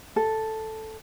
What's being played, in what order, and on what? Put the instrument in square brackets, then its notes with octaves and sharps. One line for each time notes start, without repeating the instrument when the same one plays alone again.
[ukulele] A4